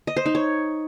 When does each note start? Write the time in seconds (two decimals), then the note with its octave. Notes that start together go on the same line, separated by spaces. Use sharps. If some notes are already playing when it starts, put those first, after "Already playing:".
0.07 D#5
0.17 C5
0.26 D#4
0.35 C#5